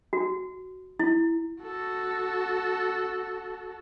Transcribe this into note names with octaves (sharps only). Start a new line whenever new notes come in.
F#4
E4
F#4 A4